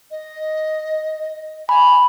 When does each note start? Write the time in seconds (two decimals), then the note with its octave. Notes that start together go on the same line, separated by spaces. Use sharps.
0.11 D#5
1.69 G#5 B5